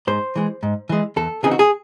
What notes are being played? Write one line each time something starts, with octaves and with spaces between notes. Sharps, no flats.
G#2 C5
E3 G#3
G#2
E3 G#3
E2 A4
C#3 E3 C4 D#4 G#4
F#4
G#4